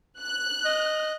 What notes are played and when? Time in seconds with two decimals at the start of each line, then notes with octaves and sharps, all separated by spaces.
0.19 F#6
0.66 D#5